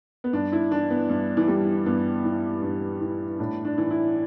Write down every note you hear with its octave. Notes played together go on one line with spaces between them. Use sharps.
B3
G2 D4
E4
E3 D4
B3
G2
E3
E3 G3
G2 B3
E3
G2
E3
A2 D4
D4
E3
E4